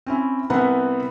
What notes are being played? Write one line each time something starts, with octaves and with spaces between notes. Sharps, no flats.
C4 C#4 E4
C2 B3 C4 B4 F#5